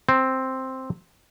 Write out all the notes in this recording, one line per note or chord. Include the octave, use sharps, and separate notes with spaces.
C4